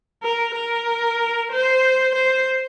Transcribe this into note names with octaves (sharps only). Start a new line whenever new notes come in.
A#4
A#4
C5
C5